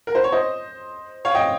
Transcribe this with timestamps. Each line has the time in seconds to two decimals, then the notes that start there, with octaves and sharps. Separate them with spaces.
0.07 A#4
0.15 C5
0.24 C#5
0.32 C5 D#5
1.25 C#5 F5
1.35 D#5 G5